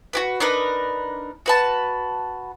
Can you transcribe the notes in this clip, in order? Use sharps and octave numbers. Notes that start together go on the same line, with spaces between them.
F#4 G4 B4
D4 D#4 A#4 B4
F#4 B4 A5